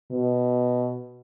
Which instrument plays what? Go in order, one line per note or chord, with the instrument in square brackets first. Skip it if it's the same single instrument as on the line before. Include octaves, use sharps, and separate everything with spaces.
[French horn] B2